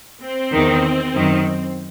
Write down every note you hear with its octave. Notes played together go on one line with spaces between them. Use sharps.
C4
E2 D#3
F#2 D#3